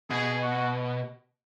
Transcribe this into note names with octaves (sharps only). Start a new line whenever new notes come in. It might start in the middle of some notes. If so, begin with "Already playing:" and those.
B2 G#4
F#4